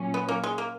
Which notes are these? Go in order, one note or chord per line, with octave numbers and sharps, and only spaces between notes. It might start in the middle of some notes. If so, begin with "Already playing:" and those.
Already playing: A#2 F#3 C#4
B3
A#3
G#3
A#3